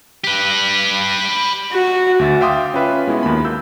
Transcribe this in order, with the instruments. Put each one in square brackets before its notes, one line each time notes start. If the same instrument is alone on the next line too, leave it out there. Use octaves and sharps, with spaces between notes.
[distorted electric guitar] G4 B4
[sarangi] F#4
[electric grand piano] D2 E5 A6
E5 F5 G5 C6 D6 D#6
C#4 F4 B4 E5
G#3 B3 E4 F#4
D#2 A#3 B5
E6 G6